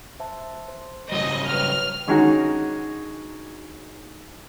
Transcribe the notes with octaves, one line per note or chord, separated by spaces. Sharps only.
C5 E5 A5
C5
C#3 F#3 G3 D#5
B4 C#5 G5 F6
D3 D#3 G#3 C#4 D#4 F#4